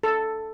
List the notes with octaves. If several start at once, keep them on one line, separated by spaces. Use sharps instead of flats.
A4